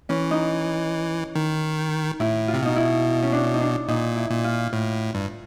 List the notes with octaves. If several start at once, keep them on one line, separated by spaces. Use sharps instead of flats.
E3 C#4
D#4
D#3
A2 E4
F4
C3
B2 D#4
E4
C#4
D4
D#4
D4
A#2 D#4
E4
A#2
F4
A2
G2